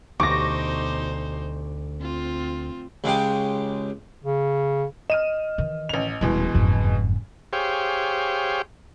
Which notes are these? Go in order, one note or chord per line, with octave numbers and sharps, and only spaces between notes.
D2 B2 D#4 C5 C#6 D6 A#6
C4 F4
C#2 C#3 G#3 G4
C#3
D#5 F6 D#7 E7
D#3 E3
A1 F7
D#1 B2 E3 G#3
F#1 F2 G#2
G4 G#4 C5 C#5 F5 G5